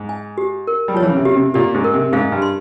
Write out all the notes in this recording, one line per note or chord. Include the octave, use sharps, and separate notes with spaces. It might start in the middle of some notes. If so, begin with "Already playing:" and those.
Already playing: G#2
G#5
G4
A#4
G3
F3 C#5
E3
C#3
C3
C#3 G4
C3
A#2 G4
G#2
A#4
C3
G#2 F5
G2
C6